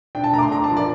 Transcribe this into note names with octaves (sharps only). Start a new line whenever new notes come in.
D4 G5
A5
A3 A#5
D6
C6
D4 A#5
A5
F3
D5